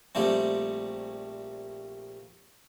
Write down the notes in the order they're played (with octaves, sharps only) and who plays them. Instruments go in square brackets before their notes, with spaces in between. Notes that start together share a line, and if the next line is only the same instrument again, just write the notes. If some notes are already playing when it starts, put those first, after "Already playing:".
[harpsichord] A#1 A#2 G3 A3 C4